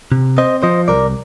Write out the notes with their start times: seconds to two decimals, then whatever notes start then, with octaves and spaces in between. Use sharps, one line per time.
0.12 C3
0.38 C4 C5 D#5
0.63 F3 C5 D#5
0.88 C2 A#4 D5